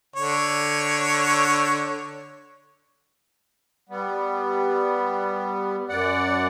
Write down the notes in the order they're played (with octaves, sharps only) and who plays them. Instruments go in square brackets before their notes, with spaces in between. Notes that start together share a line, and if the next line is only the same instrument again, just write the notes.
[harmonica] D3 C#5
[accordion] G3 B3
F#2 D5 F#5